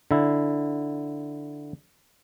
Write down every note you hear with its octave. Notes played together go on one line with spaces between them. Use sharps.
D3 E4